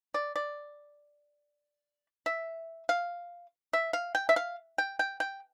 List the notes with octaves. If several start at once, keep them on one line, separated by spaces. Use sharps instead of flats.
D5
D5
E5
F5
E5
F5
G5
E5
F5
G5
G5
G5